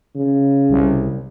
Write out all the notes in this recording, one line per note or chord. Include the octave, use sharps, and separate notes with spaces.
C#3
C2